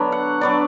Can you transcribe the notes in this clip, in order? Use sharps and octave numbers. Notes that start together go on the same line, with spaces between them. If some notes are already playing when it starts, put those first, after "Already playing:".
Already playing: D3 F#3 B3 D4
F#5
F#3 B3 D4 D5